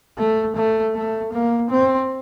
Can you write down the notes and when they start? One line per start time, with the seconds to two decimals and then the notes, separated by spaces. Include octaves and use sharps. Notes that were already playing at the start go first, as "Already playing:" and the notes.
0.18 A3
0.55 A3
0.94 A3
1.32 A#3
1.70 C4